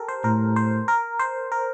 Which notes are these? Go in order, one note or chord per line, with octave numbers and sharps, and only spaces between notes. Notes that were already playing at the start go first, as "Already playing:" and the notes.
Already playing: G4 A4 A#4
C5
A2 A#4
C5
A#4
C5
A#4